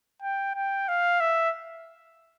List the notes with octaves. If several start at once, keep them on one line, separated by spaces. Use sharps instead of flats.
G5
G5
F5
E5